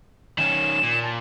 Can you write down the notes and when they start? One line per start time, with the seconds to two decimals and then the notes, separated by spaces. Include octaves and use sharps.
0.38 D#3 C#4 E7
0.83 A#2
1.03 A5